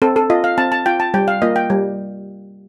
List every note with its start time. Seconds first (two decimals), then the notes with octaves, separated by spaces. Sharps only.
0.02 C4 A4
0.16 A4
0.30 F4 D#5
0.44 F5
0.58 C4 A5
0.72 A5
0.86 F4 G5
1.00 A5
1.14 G3 G5
1.28 F5
1.42 A#3 F4 D#5
1.56 G5
1.70 G3